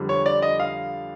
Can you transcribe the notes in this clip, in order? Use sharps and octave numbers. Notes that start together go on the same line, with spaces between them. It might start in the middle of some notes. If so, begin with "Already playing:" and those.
Already playing: F2 D3 G3
C#5
D5
D#5
F5